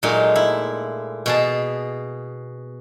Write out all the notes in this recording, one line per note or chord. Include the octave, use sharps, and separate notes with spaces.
A#2 F#3 G#3 A3 D#4
E4
B2 G#4 A5